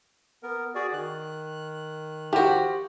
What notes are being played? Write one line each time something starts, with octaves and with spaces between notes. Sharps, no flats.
B3 A#4
F#4 G#4 D5
D#3 F#6
F3 F#4 G4